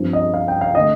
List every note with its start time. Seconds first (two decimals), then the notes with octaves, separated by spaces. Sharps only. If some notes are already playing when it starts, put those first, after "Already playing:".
Already playing: G2 F3 C4
0.13 D#5
0.34 F5
0.48 G5
0.61 F5
0.75 D3 A3 D#5